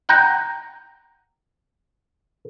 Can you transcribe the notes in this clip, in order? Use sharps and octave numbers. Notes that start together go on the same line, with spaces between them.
F#5 G5 A#5